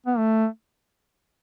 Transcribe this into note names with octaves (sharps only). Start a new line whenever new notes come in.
B3
A3